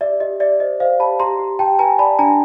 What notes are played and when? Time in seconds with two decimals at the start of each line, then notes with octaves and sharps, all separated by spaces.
0.01 G4 D5 E5
0.20 G4 D#5
0.40 G4 D5 E5
0.60 C5 D#5
0.80 C5 D#5 F5
1.00 G4 A5 B5
1.20 G4 A#5 C6
1.39 G4
1.59 G4 G5 A5
1.79 B4 G#5 A#5
1.99 D5 A5 B5
2.19 D4 G#5 A#5